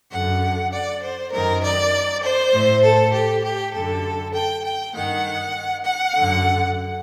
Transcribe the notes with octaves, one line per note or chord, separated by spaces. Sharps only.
F#2 D3 F#5
D5
C5
F#2 D#3 A#4
D5
C5
A2
A4
G4
G4
F#2 D3 A4
G5
G5
G2 D#3 F#5
F#5
F#2 D3